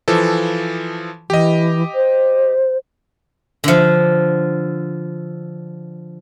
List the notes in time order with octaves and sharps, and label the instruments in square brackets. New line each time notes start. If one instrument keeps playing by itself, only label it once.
[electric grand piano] E3 F3 A4
[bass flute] E3 [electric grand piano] G4 D#5
[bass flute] C5
[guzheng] D3 F3